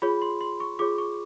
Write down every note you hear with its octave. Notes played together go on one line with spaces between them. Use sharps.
F4 G#4 C#5 B5
C6
C6
C#6
F4 G#4 C#5 D6
C#6